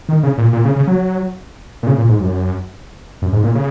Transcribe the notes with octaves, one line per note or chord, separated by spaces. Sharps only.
D#3
C#3
A#2
A#2
C#3
C#3
F#3
A#2
C#3
A#2
G#2
F#2
F#2
G#2
A#2
C#3